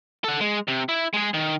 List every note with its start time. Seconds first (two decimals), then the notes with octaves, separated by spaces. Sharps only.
0.24 A4 F#5
0.41 G#3
0.68 C3
0.89 E4
1.14 G#3 G#4
1.34 D#3